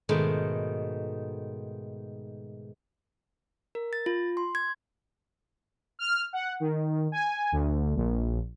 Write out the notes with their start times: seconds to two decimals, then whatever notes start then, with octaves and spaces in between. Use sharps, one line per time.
0.09 G#2 B2 D#3 A3
3.75 A#4
3.93 A6
4.06 F4
4.37 C6
4.55 G#6
5.99 F6
6.33 F#5
6.60 D#3
7.12 G#5
7.52 D2
7.95 A#1